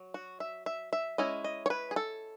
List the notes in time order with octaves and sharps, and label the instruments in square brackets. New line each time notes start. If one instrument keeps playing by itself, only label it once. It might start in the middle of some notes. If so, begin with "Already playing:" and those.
Already playing: [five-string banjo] F#3
F#4
E5
E5
E5
G#3 C#4 E4 D#5
D#5
C#5
B4
G#4
A4